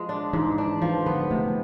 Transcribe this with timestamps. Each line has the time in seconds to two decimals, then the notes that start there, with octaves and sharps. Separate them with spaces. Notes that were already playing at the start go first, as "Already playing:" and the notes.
Already playing: F3 G#3
0.09 D4
0.33 G#2 E3
0.58 D4
0.82 E3 F3
1.06 D3 B3
1.30 C3 A3